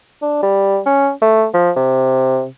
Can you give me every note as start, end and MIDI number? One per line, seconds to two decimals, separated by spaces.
0.22 0.38 62
0.43 0.79 55
0.86 1.11 61
1.22 1.46 57
1.54 1.71 53
1.76 2.46 48